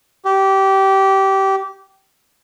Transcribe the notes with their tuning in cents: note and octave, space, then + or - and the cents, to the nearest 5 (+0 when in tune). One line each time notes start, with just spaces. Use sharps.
G4 -20